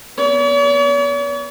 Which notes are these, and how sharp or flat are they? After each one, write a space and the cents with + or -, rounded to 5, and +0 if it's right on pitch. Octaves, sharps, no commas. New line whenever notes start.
B3 -20 C#5 +45